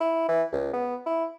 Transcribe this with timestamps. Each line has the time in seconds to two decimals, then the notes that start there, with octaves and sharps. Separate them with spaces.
0.01 E4
0.29 E3
0.52 C#2
0.73 B3
1.06 E4